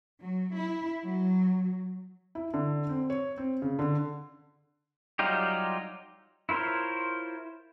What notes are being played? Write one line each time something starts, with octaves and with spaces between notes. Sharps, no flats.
F#3
E4
F#3
E4
D3
C4
C#5
C4
C#3
D3
F#3 G3 D#4 F4 G4
E4 F4 A#4 C5 C#5